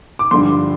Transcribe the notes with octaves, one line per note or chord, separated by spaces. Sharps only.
D6
G2 D3 F3 C6